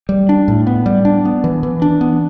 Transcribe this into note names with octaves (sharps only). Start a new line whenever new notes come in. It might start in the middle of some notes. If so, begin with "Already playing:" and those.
G3
D4
A2
B3
G3
D4
B3
E3
E3
D4
B3